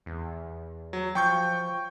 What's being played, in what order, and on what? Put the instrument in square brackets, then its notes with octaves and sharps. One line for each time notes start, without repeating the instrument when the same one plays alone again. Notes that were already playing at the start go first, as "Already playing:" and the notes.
[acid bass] E2
[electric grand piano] F#3
[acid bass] F3 [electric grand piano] G5 C#6 G6